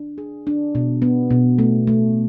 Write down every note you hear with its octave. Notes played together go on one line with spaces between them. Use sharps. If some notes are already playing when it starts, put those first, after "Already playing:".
Already playing: D4
G#4
D4
B2
B3
B2
A3
A3